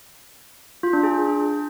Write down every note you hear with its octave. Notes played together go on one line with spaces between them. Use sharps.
F4
D4
G#4